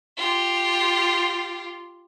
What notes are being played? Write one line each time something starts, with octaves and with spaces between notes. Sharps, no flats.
F4 G4